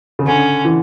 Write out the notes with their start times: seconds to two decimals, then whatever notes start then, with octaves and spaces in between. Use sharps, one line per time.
0.19 C#3
0.26 D3 C#4
0.65 E3